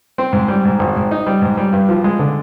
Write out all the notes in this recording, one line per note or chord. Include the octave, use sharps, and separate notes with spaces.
C4
G#2
G3
G#2
G#1
G#2
D#4
G3
G#2
G3
G2
F3
G#3
D3